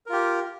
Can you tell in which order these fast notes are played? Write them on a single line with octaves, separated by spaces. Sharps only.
A#4 F4 G4